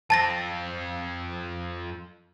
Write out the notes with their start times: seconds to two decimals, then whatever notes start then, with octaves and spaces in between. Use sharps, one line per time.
0.10 F2 C4 A5 A6 A#6